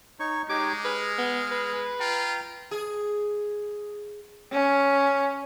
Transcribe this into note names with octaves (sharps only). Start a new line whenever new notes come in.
D#4 C#5 C#6
G#3 D#4 G4 C#5 D6
G#4 B4 F6
B3
B4
F4 G5 A#5
G#4
C#4